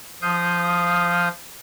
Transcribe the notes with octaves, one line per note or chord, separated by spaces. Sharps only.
F3 F5 D#6 G6